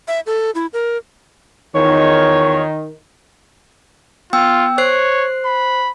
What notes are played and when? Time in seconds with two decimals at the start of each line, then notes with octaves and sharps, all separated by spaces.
0.08 E5
0.26 A4
0.55 E4
0.73 A#4
1.75 E2 D#3 F4 C#5
4.33 B3 F4 G5 E6
4.78 C5 C#5 F#6 C7
5.45 B5